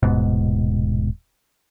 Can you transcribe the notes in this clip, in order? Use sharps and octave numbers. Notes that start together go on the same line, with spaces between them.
D#1 G#2 B2